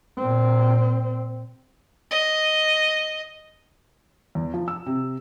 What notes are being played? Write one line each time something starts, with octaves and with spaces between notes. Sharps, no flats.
A#2 C4
D#5
E2
F3
E6
C3